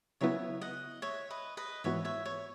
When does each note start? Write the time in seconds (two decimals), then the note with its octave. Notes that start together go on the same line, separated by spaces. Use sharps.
0.21 C#3 F#3 B3 E4 C#5 E5
0.61 D#5 F#5
1.02 C#5 E5
1.30 B4 D#5
1.57 B4 D#5
1.84 G#2 E3 B3 F#4 C#5 E5
2.05 C#5 E5
2.25 C#5